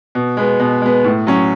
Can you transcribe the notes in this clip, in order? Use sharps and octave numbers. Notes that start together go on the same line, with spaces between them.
B2
G#3 B3
B2
G#3 B3
A2
F#3 C#4